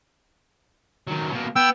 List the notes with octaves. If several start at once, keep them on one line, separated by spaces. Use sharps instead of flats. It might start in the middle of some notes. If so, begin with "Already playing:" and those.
D#3 F#3
B2 A#3
B3 G5 E6